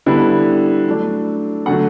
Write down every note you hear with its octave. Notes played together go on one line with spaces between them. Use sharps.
D3 G3 B3 E4
F#3 A3 D4
D3 F#3 A3 F#5